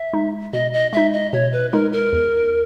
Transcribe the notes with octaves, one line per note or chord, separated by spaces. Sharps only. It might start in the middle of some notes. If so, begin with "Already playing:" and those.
Already playing: E5
G#3 D#4
B2 D#5
D#5
G#3 D#4 E5
D#5
B2 C#5
B4
G#3 D#4 A#4
A#4
E2